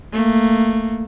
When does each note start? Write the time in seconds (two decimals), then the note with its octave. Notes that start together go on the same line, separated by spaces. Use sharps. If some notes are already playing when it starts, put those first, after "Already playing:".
0.12 A3 A#3